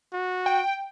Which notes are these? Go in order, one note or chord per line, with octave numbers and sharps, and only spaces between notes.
F#4
G5